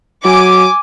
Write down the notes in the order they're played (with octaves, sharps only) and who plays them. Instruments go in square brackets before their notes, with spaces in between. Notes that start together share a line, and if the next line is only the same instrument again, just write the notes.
[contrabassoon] F#3 [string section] G#5 D6